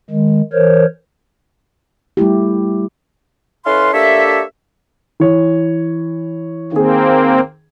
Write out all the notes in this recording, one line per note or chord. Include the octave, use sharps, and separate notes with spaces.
D#3 G#3
E3 A#4 C5 C#5
G3 A3 E4 G4
C#4 E4 A4 B4 F5 C6
A#3 D4 G4 A4 C#5 E5
E3 C#5
D#3 A#3 C4 G#4